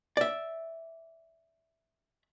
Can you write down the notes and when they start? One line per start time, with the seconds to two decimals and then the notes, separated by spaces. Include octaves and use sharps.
0.17 D5 E5